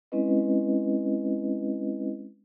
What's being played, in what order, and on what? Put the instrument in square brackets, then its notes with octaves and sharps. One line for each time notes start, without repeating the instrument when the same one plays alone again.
[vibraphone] G#3 C4 C#4 E4 B4 D#5